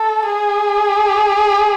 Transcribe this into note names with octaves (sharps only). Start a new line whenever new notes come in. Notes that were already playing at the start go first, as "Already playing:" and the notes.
Already playing: A4
G#4